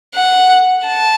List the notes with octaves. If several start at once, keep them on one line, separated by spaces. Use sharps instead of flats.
F#5
A5